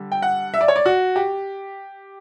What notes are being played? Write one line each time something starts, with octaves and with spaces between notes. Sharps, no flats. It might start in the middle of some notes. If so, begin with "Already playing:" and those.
Already playing: D3 G3
G5
F#5
E5
D5
C#5
D5
F#4
G4